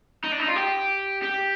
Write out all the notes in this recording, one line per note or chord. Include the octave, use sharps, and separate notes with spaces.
D#4
D4
D#4
F4
G4
G4